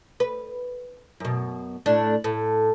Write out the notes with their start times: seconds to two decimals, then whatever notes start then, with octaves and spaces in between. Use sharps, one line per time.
0.20 B4
1.20 F#2 B2
1.86 A2 D4
2.24 A2